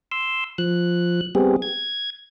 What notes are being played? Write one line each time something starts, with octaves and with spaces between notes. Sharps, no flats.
C6 E6
F3 F#6
G3 B3 C4 G4 G#4
G#6